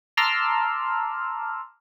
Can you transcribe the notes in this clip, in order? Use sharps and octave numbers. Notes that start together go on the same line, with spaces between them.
A5 A#5 C6 D6 E6 F6